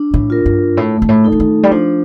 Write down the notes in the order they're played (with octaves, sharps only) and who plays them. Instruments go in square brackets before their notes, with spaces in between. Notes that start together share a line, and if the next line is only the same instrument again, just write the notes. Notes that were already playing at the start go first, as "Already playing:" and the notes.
Already playing: [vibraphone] D4
[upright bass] A2
[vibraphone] F4 A#4
[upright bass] G2
[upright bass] A2 [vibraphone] A3
[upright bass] G2
A2
[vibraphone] D#4 A4
[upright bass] D3
D#3
G3
[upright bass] F3 [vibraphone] D4